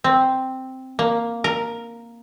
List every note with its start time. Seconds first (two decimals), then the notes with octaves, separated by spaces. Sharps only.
0.04 C4
0.99 A#3
1.44 A#4